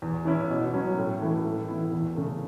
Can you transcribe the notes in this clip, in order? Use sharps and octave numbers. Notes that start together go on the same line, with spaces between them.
E2
E3 C#4 E4
B2
F#3 C#4 E4
A2
E3 A3 E4
A2
E3 B3 E4
E2
C#3 A3